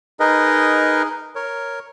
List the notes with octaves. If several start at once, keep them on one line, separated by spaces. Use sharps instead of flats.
D#4 G#4 A#4 B4 D#5
A#4 C#5